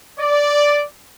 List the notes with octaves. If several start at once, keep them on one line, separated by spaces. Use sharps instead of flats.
D5